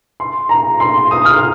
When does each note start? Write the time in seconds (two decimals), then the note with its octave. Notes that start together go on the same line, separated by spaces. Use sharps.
0.20 C6
0.49 A#5
0.80 C6
1.11 D#6
1.25 F6